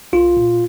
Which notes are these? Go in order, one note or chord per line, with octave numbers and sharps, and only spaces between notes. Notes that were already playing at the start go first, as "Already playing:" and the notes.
C2 F4
A#2